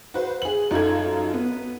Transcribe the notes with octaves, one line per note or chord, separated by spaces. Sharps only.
F#4 B4 C5
G#4 F#7
F#2 D#4 F4 A4 G#6
B3